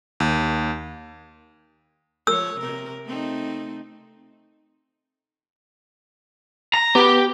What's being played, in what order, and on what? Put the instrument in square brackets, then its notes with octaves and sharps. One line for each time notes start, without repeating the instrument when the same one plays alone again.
[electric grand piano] D#2
[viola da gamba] F3 C#5 [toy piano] E6
[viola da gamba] C3 A#4
A3 C4 D#4
[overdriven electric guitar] A#5
[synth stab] B3 [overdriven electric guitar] G4